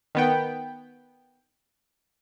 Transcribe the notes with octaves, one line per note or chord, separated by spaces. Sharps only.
D#3 B3 G5